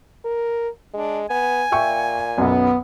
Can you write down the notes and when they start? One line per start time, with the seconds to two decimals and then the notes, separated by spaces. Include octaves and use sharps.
0.25 A#4
0.94 G#3 D4
1.30 B3 G#5
1.72 A#2 E5 G5 C#6
2.38 B1 F#2 B3